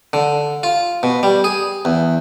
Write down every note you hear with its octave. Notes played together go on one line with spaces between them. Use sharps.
D3
F4
B2
G3
G#4
E2